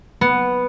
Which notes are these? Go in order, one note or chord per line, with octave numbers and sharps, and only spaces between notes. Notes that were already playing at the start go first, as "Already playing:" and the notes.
B3